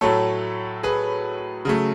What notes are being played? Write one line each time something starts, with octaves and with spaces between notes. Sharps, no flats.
A2 F#3 A3 A4 C#5
G#4 B4
C#3 F#3 A3